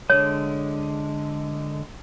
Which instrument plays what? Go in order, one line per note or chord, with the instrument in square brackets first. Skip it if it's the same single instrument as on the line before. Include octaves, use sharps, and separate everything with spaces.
[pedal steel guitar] D3 G#3 [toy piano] C#5